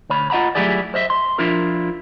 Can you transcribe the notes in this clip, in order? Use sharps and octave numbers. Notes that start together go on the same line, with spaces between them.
D2 C#5 B5
F4 D#5 F#5 A#5 B5
F#3 A3 E4 G4 G#4 D5
C5 D#5 E5
C6
F3 D4 E4 F4 A#4